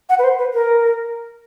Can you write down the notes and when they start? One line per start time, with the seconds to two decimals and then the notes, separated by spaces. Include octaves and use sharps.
0.09 F#5
0.19 B4
0.24 C5
0.38 B4
0.54 A#4